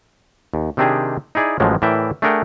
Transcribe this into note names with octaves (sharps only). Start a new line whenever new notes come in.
D#2
C3 D#3 C4 D4 G4 G#4
D#4 E4 G#4 D5
A1 A2 F3 F#3 G#3
A2 E3 A#4 D5 E5 G5
A3 D4 G#4 A#4 F#5 G5